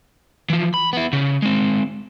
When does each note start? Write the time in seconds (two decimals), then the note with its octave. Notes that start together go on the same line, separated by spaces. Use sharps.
0.50 E3 F3
0.74 B5
0.93 B3 E4
1.13 C#3
1.42 G#3 C4